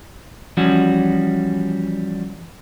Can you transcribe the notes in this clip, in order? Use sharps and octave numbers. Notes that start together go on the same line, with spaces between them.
E3 F3 G3 C#4 F#4